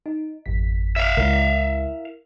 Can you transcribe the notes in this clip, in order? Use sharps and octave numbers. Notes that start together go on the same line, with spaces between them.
D#4
G#1 F2 B6
E5 F5
C#2 E4 A#4